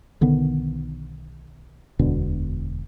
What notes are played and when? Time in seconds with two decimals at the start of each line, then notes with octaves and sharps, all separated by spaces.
0.21 B1 D3 D#3 B3
1.99 E1 D2 B2 D3